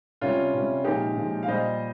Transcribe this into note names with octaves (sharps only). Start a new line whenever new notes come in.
C3 G3 C#4 F4
C3 G3
A#2 F3 G#3 D#4 G4
A#2 F3 G#3
F5
A#2 G3 C5 D#5